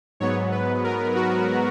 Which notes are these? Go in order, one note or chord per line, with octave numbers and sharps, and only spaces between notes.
G#2 F#3 B3 C#5
B4
A#4
F#4